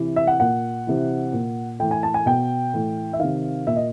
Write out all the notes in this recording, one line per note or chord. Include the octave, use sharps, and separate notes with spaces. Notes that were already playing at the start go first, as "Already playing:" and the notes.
Already playing: C3 E3
E5
F#5
A#2 F#5
C3 E3
A#2
A2 E3 G5
G#5
A5
G#5
B2 G5
A2 E3
E5
C3 D#3 F5
A#2 E5
D#5